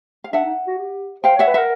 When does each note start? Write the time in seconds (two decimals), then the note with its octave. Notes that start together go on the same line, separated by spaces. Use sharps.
0.24 F5
0.33 D4 E5 F#5
0.45 D#4
0.67 F#4
0.79 G4
1.24 C5 F5 G5
1.36 C#5
1.39 E5 F#5
1.47 B4
1.54 A#4 E5 F#5